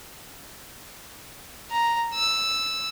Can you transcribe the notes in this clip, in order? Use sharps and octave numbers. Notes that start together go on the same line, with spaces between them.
A#5
E6